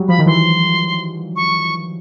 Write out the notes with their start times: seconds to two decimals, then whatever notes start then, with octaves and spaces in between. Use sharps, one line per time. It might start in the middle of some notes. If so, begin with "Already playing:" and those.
Already playing: F#3 G3
0.08 F3 B5
0.19 D#3
0.26 E3 C6
1.36 C#6